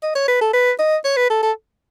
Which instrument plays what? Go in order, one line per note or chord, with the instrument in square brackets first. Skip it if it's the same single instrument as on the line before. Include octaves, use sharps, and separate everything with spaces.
[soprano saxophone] D#5
C#5
B4
A4
B4
D#5
C#5
B4
A4
A4